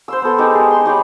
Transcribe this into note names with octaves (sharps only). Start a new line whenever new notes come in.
C5 C6 E6
B3 A4
G#3 D#4 G4 A4
G#4
C6
D#4 G4 C#5 B5